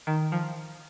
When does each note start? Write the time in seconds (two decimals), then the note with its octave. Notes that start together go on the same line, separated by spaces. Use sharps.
0.07 D#3
0.32 F3